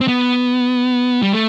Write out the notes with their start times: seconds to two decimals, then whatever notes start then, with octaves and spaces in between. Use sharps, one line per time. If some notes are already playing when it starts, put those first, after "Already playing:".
0.01 C4
0.08 B3
1.22 G3
1.33 A3